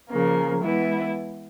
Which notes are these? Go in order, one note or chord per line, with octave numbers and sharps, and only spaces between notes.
C#3 F3 A#3
E3 G#3 B3 E4